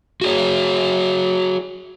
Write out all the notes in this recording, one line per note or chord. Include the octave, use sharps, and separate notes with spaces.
F#4 G#4 C#5